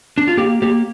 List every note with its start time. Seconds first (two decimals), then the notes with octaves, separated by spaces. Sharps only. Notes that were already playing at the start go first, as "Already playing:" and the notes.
0.18 D4
0.28 F4
0.37 A#3 G4
0.62 A#3 G4